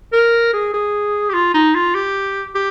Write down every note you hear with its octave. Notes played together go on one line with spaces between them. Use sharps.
A#4
G#4
G#4
G4
F4
D#4
F4
G4
G4